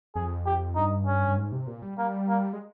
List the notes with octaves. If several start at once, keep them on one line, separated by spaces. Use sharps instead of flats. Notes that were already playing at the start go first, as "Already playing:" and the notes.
F2 G#4
G4
G2 D#4
C#4
G2
G#2
C3
A#2
G3
G3 A#3
A#3
G#3